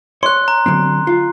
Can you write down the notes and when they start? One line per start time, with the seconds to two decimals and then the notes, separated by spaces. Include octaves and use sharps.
0.23 C#5 C6 F#6
0.48 A#5
0.66 D3 F#3 C4
1.07 F4